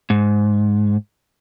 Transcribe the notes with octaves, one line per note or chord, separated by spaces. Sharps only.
G#2